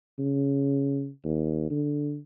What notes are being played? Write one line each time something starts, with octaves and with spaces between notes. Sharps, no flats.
C#3
D#2
D3